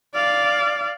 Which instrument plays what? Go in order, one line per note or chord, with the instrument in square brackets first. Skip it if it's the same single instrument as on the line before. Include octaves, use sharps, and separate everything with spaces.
[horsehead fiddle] D5 F5